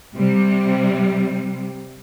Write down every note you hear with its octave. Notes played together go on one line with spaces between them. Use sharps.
C3 G3